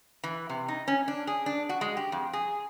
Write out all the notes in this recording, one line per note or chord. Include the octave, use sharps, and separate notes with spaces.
E3
C3
D#4
C#4
D4
G#4
D4
F#4
G#3
G4
F2
G#4